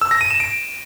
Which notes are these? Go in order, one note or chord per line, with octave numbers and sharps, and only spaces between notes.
E6
A#6
D#7
E7
D7